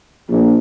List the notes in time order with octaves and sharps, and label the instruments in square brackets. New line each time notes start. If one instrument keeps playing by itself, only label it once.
[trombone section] A#1